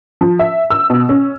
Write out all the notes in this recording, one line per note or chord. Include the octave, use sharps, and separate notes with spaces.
F3
E5
E6
B2
C#4